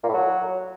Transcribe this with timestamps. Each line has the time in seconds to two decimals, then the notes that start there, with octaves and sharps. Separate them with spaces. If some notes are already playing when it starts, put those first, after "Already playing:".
0.03 A#2
0.08 A2
0.14 F#3